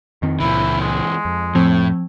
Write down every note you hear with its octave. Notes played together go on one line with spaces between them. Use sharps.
F2 D#3 C4
C#2 A#2 E3 C4 E4
G#3
F2
A2 F3 C4